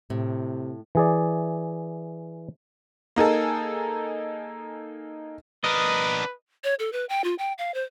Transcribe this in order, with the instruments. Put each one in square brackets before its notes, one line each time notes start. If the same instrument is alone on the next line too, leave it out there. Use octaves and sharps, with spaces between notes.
[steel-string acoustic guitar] A2 [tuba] C3
[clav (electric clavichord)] E3 G#4 D5
[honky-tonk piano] A#3 D#4 G#4 A4
[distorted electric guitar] D4 A#4 [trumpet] B4 [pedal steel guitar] D#5
[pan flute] C#5
A4
B4
G5
F4
G5
F5
C5